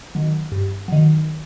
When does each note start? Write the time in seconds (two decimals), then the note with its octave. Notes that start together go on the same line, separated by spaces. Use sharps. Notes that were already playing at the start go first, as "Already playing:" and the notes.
0.15 D#3 F#3
0.52 G2
0.88 D#3 F#3